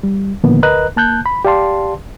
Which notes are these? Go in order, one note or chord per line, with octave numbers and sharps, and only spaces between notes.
G3
A#2 D3 D#3 F3 A#3 B3
D2 A#4 B4 D#5 A#5 F#6
A#3 A5 F#6 G6
B5
G4 D5 F5 A5 C6